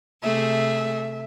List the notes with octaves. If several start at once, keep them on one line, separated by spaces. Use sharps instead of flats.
C3 A3 G#4 E5